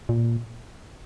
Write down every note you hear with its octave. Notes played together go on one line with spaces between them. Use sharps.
A#2